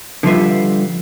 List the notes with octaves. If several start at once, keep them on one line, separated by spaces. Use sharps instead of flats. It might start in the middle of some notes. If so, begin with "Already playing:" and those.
D3 F3 G3 F4 B4 E5